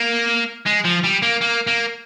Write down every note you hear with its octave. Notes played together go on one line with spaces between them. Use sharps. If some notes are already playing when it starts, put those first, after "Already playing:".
Already playing: A#3
G#3
F3
G3
A#3
A#3
A#3